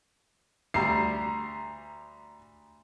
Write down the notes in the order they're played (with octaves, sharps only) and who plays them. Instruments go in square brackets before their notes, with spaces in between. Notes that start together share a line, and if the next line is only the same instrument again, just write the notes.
[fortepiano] D2 G3 [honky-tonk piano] A#5 C7